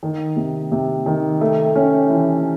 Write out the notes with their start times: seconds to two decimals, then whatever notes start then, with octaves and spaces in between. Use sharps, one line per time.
0.03 D#3
0.36 C3
0.71 C3
1.06 D#3
1.41 A3
1.75 C#4
2.10 E3